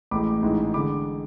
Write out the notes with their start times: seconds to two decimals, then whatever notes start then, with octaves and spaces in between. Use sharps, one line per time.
0.11 A1 A2 G#3 B5 D6
0.42 A1 G#2 E3 G#3
0.74 D3 G#3 B5 D6